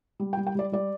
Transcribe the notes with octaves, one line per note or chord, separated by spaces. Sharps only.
G3
G5
G3
G5
G3 D5
G3 D5